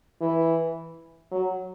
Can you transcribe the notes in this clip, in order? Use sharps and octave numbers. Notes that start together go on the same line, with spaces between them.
E3
F#3